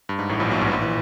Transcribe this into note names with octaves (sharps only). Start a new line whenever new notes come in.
G2
G#2
A1 A2
A#1 A#2
B1 B2
G#2
A#1 A#2
E3